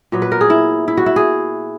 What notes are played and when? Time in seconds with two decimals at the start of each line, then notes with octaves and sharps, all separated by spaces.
0.12 A#2 F#3 B3
0.22 B4
0.32 A#4
0.41 G#4
0.50 E4
0.88 E4
0.97 F#4
1.06 E4
1.16 G#4